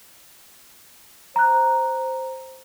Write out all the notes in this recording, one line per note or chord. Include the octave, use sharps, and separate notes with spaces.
C5 A#5 F#6